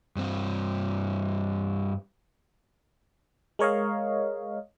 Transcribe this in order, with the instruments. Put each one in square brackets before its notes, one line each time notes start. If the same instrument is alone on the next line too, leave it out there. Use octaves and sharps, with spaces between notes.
[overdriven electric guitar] G2 C4
[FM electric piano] G#3 A#4 C#5 D#5 F5